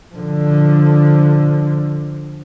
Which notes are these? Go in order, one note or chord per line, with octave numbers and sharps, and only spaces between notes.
D3 F3